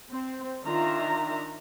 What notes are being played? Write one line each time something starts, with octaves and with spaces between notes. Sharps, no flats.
C4
D#3 D4 F4 E5 A#5